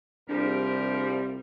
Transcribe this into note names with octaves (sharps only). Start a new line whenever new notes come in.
C2 F3 G3 D4 G#4 A#4